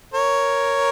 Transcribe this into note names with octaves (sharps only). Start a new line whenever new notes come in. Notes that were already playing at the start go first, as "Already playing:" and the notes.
A#4 C#5